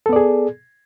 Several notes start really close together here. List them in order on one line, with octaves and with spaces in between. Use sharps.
A4 B3 D5 G#4